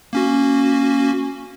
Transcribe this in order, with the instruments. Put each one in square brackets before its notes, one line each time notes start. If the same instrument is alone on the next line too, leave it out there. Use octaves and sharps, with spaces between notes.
[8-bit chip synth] A#3 C#4 F#4